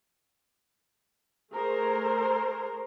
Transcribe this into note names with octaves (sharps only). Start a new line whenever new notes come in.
A3 G#4 A#4 C5